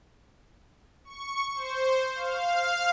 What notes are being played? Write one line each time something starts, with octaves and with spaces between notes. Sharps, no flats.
C#6
C5
F5